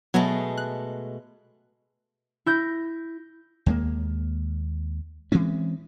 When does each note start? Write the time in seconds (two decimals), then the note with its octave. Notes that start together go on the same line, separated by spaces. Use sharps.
0.14 B2 F#3 G#3 A3 B3 G#6
0.57 F#6
2.46 E4 G6 A#6
3.66 D#2 G#3 A#3
5.32 E3 G#3 C4 C#4